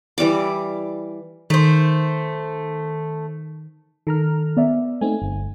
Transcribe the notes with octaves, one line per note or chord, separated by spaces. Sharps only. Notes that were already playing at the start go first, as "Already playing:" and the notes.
E3 G3 D5 D6
D#3 A3 C5
D#3 A4 A#5 F6
B3 D5 E5
A3 C4 D#4 G#5
G1